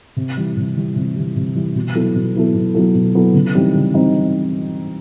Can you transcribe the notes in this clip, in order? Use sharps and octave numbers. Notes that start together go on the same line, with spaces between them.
C3
E3 G3
C3
E3 G3
C3
E3 G3
C3
E3 G3
B2
F#3 B3 E4 A4
B2
F#3 B3 E4 A4
B2
F#3 B3 E4 A4
B2
F#3 B3 E4 A4
C#3
E3 G3 C4 D#4
C#3
E3 G3 C4 D#4